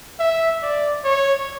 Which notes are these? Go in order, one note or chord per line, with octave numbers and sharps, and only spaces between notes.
E5
D5
C#5